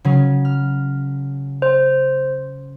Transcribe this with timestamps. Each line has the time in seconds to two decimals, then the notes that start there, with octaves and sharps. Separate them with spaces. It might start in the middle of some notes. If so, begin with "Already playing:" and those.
0.04 C#3 F#3 C#4
0.45 F6
1.62 C5